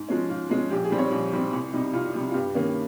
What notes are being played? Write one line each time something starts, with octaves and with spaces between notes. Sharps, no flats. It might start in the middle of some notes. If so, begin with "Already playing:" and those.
Already playing: G#2
F3 G#3 C#4
G#2 F4
F3 G#3 C#4
A#1 G4
G#4
G#2 G3 C4
C#5
A#1
G#2 G3 C4
C2
C3 G3 D#4
C2 F4
C3 G3
F4
G2 G4
D#3 A#3 C#4